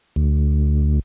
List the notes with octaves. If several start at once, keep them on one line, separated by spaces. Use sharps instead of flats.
D2